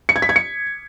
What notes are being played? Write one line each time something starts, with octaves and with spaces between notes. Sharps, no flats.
C#7
G#6
B6
G#6
C#7